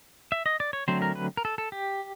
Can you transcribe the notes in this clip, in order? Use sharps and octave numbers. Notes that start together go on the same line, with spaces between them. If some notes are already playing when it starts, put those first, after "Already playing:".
E5
D#5
D5
C#5
D3 F#3 A3 C4 C5
A#4
B4
A#4
A4
A4
G4